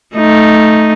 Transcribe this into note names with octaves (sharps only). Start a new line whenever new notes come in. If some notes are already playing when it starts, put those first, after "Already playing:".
A3 D#4